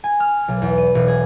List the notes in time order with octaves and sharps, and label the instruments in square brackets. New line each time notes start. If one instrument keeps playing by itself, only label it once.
[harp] G#5
F6
B1
E2
D#7
E1
G#4